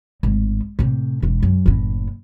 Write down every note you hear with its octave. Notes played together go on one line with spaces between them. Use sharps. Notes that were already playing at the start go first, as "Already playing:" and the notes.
G#1 A2
A2 C3
E1 E3
F#2
F#1 A2